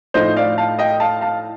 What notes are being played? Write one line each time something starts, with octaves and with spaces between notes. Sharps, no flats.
A2 F3 A3 D#4 C5 D#5
D5 F5
F5 A5
D#5 G5
F5 A5
F5 A5